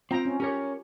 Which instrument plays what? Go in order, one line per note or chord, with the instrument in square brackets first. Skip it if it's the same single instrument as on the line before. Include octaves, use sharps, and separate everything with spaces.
[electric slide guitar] C4 [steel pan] F4 G5 A#5
[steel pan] C#4
[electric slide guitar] C#4 A#4 C#5 [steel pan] G4